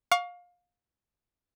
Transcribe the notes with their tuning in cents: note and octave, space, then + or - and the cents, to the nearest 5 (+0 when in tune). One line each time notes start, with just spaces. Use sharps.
F5 +25 C#6 +25